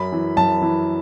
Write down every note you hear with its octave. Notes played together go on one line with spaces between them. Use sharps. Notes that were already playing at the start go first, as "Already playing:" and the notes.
Already playing: F#2 B5
E3
F#2 A5
E3